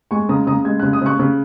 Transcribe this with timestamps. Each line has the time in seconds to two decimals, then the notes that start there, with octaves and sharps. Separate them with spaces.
0.11 G#3 G#5 C#6
0.29 C#3 A#5 D#6
0.47 C#3 A#5 D#6
0.65 G#3 G#6
0.79 C#3 F#6
0.93 D#6
1.02 C#3 C#6 F#6
1.19 C#3